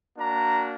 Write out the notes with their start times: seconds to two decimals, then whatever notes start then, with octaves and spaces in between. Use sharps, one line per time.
0.18 A#3 D4 F#4 A#5